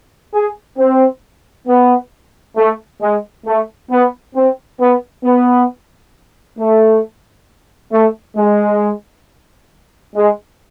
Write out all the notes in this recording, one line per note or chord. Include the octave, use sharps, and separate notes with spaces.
G#4
C4
B3
A3
G#3
A3
B3
C4
B3
B3
A3
A3
G#3
G#3